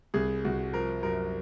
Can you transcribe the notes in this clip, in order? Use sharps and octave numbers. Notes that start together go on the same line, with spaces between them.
C2 G#4
C2 F#4
F3 A#4
F#2 A#4